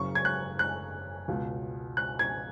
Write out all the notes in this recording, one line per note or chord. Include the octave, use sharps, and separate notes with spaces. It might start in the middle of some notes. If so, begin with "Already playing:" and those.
Already playing: F#1 F#2 C#3 C#6
G#6
F#6
F#6
C#2 B2
F#6
G#6